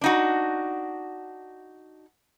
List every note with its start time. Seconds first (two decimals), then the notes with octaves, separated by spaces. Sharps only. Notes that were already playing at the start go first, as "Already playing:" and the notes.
0.01 D4 D#4 F#4